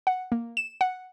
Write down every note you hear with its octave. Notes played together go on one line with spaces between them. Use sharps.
F#5
A#3
E7
F#5